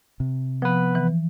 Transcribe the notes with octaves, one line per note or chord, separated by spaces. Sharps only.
C3
F3 B3 B4
E3